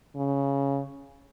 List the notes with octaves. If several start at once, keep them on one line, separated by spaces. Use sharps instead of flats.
C#3